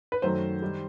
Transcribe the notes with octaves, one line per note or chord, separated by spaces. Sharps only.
B4
F#2 D#3 F#3 A3 C5
D#3 G3